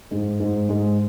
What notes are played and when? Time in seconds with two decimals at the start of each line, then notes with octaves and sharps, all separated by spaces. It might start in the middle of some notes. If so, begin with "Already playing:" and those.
0.11 G#2 G#3
0.40 G#2 G#3
0.69 G#2 G#3